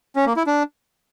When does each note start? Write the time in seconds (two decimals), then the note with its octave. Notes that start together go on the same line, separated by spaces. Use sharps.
0.16 C#4
0.26 A#3
0.37 E4
0.47 D4